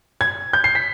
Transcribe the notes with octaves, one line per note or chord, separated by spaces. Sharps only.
G#6
G6
C7
B6